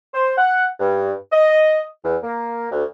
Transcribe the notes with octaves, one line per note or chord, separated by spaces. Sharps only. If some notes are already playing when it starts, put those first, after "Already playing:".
C5
F#5
G2
D#5
E2
A#3
D2